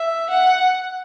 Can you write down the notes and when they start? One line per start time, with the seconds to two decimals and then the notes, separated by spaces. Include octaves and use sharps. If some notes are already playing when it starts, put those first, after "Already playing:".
Already playing: E5
0.30 F#5